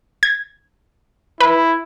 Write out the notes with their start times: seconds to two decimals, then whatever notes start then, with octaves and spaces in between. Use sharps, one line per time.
0.23 G#6
1.40 E4 B4